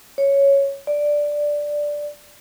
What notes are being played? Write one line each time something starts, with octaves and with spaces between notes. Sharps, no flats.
C#5
D5